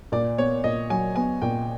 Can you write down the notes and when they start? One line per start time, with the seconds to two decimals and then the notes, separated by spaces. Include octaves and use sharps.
0.12 A#2 D5
0.38 B3 C#5
0.64 A#2 D#5
0.90 F#3 G#5
1.16 B3 G#5
1.42 A#2 G5